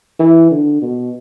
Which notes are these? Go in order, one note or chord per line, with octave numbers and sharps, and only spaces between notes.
E3
D3
B2